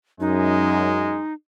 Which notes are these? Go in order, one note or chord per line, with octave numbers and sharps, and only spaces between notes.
F#2 G#3 D#4